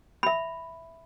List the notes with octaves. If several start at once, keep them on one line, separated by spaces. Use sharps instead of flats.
E5 B5